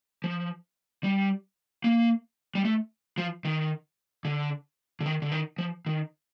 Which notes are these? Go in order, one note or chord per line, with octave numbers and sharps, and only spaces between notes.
F3
G3
A#3
G3
A3
F3
D#3
D3
D3
D#3
D3
D#3
F3
D#3